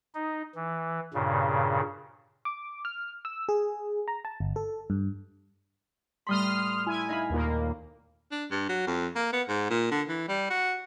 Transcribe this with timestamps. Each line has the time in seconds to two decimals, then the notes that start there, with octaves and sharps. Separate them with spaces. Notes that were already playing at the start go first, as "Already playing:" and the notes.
0.15 D#4
0.55 E3
1.14 G2 A#2 C#3
2.45 D6
2.85 F6
3.25 E6
3.49 G#4
4.08 A#5
4.25 A5
4.40 G1
4.56 A4
4.90 G2
6.27 A2 G3 B5 C6 D#6 F6
6.86 E4 G#5
7.09 D#4 F5 B5
7.30 D#2 A#2 A#3
8.31 D4
8.51 G2
8.69 F#3
8.87 F2
9.16 A#3
9.33 B3
9.48 G#2
9.70 A#2
9.91 D3
10.09 E3
10.28 G3
10.50 F#4